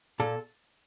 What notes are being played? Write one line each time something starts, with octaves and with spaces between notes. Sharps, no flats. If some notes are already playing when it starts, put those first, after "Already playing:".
A#2 A4